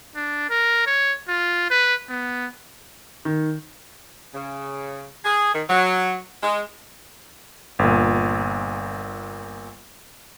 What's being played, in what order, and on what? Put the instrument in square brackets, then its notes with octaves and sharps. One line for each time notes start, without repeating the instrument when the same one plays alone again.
[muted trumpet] D4
A#4
C#5
F4
B4
B3
[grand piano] D#3
[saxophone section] C#3
G#4
D#3
F#3
G#3
[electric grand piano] G1 A#2